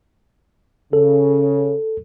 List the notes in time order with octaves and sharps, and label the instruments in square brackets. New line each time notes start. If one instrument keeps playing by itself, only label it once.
[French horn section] C#3 [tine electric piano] A4